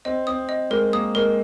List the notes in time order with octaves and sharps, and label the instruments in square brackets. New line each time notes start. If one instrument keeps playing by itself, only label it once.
[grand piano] C4 [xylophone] D#5
[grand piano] C4 [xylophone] D#6
[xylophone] D#5
[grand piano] G#3 [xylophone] A#4
[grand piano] A#3 [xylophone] D#6
[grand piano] G#3 [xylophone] A#4